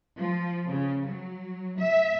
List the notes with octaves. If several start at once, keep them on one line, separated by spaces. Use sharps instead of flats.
F3
C#3
F#3
E5